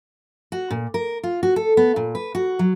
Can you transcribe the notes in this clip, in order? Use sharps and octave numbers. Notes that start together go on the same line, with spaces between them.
F#4
A#2
A#4
F4
F#4
A4
B3
A#2
B4
F#4
F#3